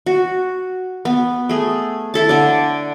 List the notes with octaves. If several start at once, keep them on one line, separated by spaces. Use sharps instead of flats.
F#4
B3
A3 G#4
E4 A4 A5
D3 D4